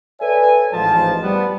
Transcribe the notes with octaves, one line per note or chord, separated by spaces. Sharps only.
A4 B4 C#5 D5 E5 G#5
A1 G#2 F3 A5
G3 B3